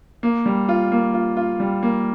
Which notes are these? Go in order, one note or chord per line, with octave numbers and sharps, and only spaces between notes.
A#3
G3
F4
A#3
F4
F4
G3
A#3